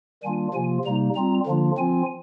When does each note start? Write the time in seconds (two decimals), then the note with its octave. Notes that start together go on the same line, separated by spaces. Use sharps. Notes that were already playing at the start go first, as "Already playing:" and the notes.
0.23 D#3 G3 A#3 D4 F4 G#5
0.54 C3 F3 A#3 F4 G#5
0.85 C3 G3 A#3 D#4 A#5
1.15 G3 C4 F4 A#5
1.46 D3 F3 A#3 D4 F4
1.78 F3 C4 F4 G#5